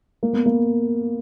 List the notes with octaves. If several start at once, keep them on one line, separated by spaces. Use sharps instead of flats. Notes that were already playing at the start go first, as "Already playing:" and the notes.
A#3
B3
A#3